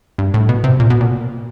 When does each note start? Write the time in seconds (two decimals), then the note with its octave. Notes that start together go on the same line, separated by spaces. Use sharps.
0.18 G2
0.34 A2
0.49 B2
0.64 C3
0.80 A#2
0.90 B2
1.01 A#2